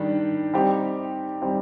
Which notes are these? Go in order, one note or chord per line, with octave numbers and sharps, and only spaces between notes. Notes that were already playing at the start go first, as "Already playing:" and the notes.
Already playing: D#3 G3 D4
G3 C4 D#4 G4
G3 C4 D#4 G4